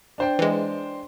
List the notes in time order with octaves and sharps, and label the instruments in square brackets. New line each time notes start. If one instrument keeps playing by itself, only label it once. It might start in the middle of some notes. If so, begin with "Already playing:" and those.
[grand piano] D4 C5 G5
[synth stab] E3 G#3